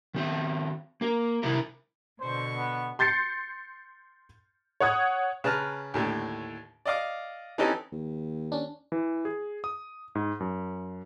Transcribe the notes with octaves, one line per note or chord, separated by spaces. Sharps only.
D#3 C4 E5
A#3 A#4
C3 D#3 E4 A#4
B2 D3 C5 C#6
B3
C6 G6 A6 C7 C#7
C#5 F#5 D#6 G#6
C#3 B4 A5 A#5 F6
D#2 A2 D3
D5 D#5 F5 D6
E3 C4 C#4 D#4 G4 A4
D#2
C#4 D4
E3
G#4
D#6
G#2
F#2